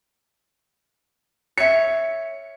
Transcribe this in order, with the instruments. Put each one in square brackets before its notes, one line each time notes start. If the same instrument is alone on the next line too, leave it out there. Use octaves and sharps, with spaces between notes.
[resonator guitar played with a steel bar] C#5 E5 [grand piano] C#7